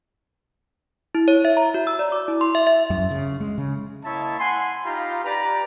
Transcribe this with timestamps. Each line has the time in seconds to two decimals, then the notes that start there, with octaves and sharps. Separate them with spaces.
1.15 E4
1.28 C#5
1.45 E5
1.57 A#5
1.74 F#4
1.87 E6
1.99 D5
2.12 D6
2.28 E4
2.41 C6
2.55 E5
2.67 E5
2.90 F#2
3.11 C#3
3.40 G#3
3.58 C#3
4.04 A#3 E4 C#5 D#5 E5 A5
4.39 F#5 G#5 B5 C6
4.84 D#4 F4 G4 A#5 B5
5.24 G4 B4 D5 A#5